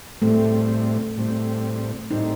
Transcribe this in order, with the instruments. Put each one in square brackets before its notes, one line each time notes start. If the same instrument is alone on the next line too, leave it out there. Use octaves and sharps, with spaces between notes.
[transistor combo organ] A2 G3 C4 [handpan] A3
[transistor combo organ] A2 G3 C4
[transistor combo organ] A2 G3 C4 [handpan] D#4